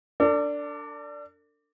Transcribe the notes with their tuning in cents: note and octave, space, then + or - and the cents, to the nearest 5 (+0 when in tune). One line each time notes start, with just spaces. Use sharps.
D4 -5 A4 +45